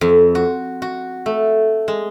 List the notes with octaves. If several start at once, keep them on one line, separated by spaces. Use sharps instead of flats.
F2
F#4
F#4
A3
G#3